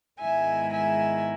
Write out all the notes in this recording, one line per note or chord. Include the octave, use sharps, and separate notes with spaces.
G#2 D#3 G#3 B3 E4 E5 G#5
E5 G#5